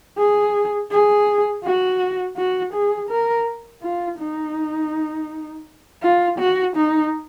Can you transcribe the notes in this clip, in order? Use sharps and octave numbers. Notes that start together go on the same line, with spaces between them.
G#4
G#4
F#4
F#4
G#4
A#4
F4
D#4
F4
F#4
D#4